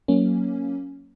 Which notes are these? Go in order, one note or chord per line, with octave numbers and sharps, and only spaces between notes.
F#3 A#3 C#4